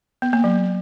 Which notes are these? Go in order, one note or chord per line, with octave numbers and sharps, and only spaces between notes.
B3
A#3
F#3